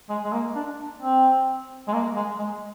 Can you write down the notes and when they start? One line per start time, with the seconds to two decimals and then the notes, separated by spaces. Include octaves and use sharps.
0.10 G#3
0.25 G#3
0.33 A#3
0.56 D4
1.02 C4
1.88 G#3
1.94 A#3
2.16 G#3
2.39 G#3